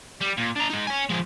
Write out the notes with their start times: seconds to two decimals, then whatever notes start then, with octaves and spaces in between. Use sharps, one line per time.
0.21 G3
0.38 A#2
0.56 D4 A#5
0.70 G#3 D#4
0.87 C#5 G#5
1.09 F3 G#3